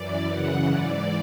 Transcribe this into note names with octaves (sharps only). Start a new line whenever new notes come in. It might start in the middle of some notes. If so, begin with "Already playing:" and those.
Already playing: F#2 E3 D5
F#2 C#3 E3 F#5
G#2 E3 D5